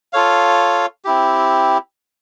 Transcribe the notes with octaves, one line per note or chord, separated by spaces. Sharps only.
F4 A4 C#5 F5
C4 E4 G4